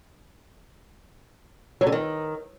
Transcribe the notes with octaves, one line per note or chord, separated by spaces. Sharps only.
F#3
D3
D#3